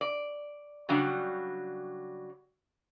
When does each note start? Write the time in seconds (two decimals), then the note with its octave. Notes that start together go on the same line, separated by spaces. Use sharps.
0.01 D5
0.89 C#3 F#3 G3 D4